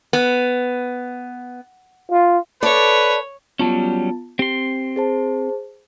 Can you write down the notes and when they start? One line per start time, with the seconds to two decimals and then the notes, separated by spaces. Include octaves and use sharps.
0.13 B3
2.11 F4
2.63 A4 B4 C#5 D5
3.59 F#3 G3 B3 C#4 F4 A5
4.39 C4 G4 C6
4.96 G#4 C5 A5